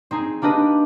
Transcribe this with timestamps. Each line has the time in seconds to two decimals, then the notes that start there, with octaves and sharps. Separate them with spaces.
0.11 C4 D#4 G#4
0.42 A#3 D4 G4 B4 D#5